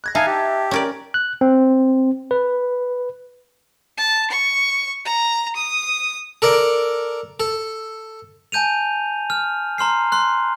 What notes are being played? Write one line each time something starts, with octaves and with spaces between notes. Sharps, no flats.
F#6 G#6 A#6
D#4 E5 F5 G#5 A5
G4
C#4 A#4 D5
F#6
C4
B4
A5
C#6
A#5
D#6
A4 A#4 D5
A4
G#5 A5 G6 D#7 F7
F6
A#5 C6 F6 C7
C6 F#6